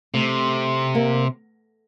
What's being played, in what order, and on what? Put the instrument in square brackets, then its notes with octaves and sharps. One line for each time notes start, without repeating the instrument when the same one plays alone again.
[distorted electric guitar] C3 [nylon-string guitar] A3
[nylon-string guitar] A#3